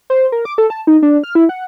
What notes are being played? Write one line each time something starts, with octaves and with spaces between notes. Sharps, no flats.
C5
A#4
D6
A4
A5
D#4
D4
F6
E4
F#5